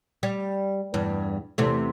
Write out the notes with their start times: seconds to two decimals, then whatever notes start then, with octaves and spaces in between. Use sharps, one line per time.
0.23 G3
0.94 E2 G2
1.58 E2 C3 A3